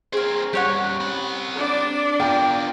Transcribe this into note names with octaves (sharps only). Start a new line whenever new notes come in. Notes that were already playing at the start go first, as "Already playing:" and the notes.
C#4 G#4 A#4 C5
G3 C#4 G4 C#5 F#5
C4 B5
D4 D5
B3 F4 A#4 G5